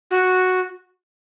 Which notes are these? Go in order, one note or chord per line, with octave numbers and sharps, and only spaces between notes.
F#4